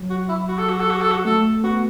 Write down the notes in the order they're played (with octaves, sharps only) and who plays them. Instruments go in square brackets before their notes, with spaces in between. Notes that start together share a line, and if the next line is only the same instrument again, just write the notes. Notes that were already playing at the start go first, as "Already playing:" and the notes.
Already playing: [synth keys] F#3
[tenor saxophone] F#4
E4
F#4
A4
F#4
A4
F#4
A4
F#4
[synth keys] A3 [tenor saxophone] A4
[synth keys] B3 [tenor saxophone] F#4